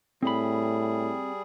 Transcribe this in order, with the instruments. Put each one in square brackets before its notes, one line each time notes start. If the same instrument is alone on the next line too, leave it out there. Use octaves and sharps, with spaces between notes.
[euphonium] A2 [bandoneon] G3 G#4 [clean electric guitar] C4 B5